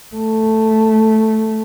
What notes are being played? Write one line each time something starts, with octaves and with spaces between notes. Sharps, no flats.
A3